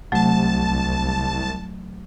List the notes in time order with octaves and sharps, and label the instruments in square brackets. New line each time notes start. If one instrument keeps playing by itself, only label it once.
[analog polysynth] C2 A5 [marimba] F#3 A3